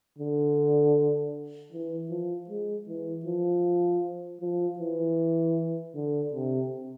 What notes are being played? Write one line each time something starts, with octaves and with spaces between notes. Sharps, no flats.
D3
E3
F3
G#3
E3
F3
F3
E3
D3
C3